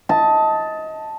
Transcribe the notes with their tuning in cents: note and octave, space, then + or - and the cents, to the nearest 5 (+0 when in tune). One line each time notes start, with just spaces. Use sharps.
D#5 +25 A5 +0